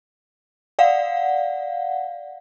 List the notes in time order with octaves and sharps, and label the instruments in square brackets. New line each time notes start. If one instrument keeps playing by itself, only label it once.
[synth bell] D5 F5 F#5